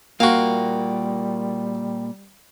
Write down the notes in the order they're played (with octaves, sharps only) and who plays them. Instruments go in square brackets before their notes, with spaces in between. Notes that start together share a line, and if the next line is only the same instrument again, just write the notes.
[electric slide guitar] A#2 G5 [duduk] G3 [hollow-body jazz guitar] A#3 [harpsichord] F#4 F5